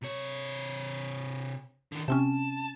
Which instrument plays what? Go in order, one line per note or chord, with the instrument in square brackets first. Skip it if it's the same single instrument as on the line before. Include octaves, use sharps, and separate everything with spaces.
[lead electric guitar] C3 C#5
D3 D#3
[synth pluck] C3 C4 C#4 [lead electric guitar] A5